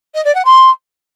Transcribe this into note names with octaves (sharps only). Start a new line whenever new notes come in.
D#5
D5
F#5
C6